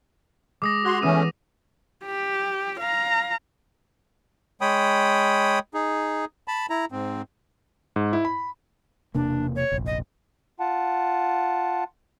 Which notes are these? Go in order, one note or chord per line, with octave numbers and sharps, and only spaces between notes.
G#3 D6 D#6 A#6
F#4 F#5 C6 F#6 G#6
E3 A3 B3 C#4 D#6 D#7
G4
F5 A#5
G#3 C#5 G5 B5 D#6
D#4 G#4
A5 B5
E4 A#5
G#2 C4
G#2
E4
B5
E1 C3 A#3 D4
C#5
F1 A#1
D#5
F4 F#5 A5